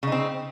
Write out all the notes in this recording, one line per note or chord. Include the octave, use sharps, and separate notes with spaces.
C#3 C4 D#4